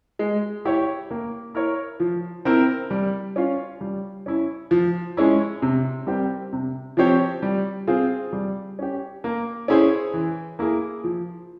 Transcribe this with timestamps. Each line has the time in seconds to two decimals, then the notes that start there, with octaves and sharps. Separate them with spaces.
0.19 G#3
0.65 E4 G4 C#5
1.11 A#3
1.55 E4 A#4 C#5
2.00 F3
2.45 C4 E4 A#4
2.90 G3
3.36 C#4 F4
3.81 G3
4.26 C#4 E4
4.71 F3
5.17 G#3 C#4 E4
5.62 C3
6.06 G3 C4 G4 A#4
6.53 C3
6.97 F3 C4 G4 C#5
7.42 G3
7.87 C4 F4 G#4
8.33 G3
8.79 C#4 G4
9.24 A#3
9.68 C#4 E4 G#4 C5
10.13 E3
10.59 A#3 E4 G#4
11.04 F3